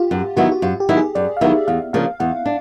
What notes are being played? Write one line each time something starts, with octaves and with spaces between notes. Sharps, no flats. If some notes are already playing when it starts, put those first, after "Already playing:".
Already playing: F4 G4
F#2
D#3 F#3 B3 E4 F#4
F#4
F#2 F4
G4
D#3 F#3 B3 E4
G#4
F#2 D5
F5
D#3 F#3 B3 E4 E5
E2 F5
C#3 F3 A#3 D4 F5
E2 F#5
D4